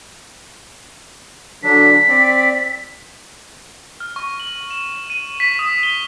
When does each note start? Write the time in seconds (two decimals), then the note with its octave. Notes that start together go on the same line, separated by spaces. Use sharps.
1.63 D3 F#3 D4 B6
2.08 C4 D5
4.00 F6
4.16 C#6
4.40 F#7
4.71 E7
5.10 D#7
5.40 B6
5.59 D#6
5.83 G7